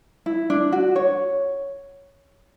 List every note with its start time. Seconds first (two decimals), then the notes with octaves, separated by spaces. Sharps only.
0.26 E4
0.50 D4
0.72 F#4
0.96 C#5